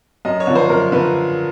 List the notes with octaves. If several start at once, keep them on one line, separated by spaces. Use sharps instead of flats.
F#2 D#5
C#5
D3 F3
C5
F#2 A#4
D3 F3 B4